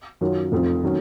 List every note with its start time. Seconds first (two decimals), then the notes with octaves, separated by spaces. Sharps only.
0.21 F#2 D#3 F#3 C#4 F4
0.52 F1 F2 F3
0.84 D#3 F#3 C#4